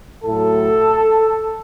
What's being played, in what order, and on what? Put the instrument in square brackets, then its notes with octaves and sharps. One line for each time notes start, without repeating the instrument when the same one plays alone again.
[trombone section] A2 F#3 A4